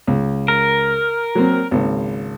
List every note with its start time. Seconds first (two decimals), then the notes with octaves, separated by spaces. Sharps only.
0.07 C#2
0.48 A#4
1.35 F#3 A#3 C4
1.71 G#1 C#2 A#3